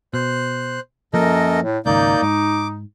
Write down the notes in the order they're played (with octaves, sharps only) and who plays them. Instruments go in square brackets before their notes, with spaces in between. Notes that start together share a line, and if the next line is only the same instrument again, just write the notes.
[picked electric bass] B2 [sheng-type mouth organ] C5 F#6
[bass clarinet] F#2 [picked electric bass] F3 A#3 [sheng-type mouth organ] A4 A#4 D#5
[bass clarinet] A2
[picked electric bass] G#1 C#2 [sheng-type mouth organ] A#3 D5 G6 [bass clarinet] D#4
[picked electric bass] G#2 [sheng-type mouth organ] D6